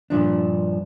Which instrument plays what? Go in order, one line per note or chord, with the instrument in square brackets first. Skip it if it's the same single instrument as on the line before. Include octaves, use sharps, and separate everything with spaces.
[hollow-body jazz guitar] G2 A#2 F3 D4